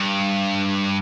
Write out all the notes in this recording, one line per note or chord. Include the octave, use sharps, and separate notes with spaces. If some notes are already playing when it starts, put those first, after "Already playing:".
Already playing: G2